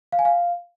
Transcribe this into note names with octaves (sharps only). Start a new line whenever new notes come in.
F5
G#5
F5